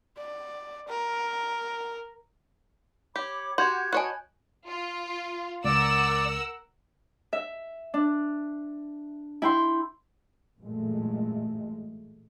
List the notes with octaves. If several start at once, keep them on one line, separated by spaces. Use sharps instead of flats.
D5
A#4
G4 C#5 B5 D6
F#4 G4 F#5 C6 G6 G#6
F#4 C#5 D#5 G#5 A5 B5 F#6
F4
C#2 A#4 D5 F#5 E6
E5
D4
E4 G5 C6
A1 F#2 A#2 G#3 A3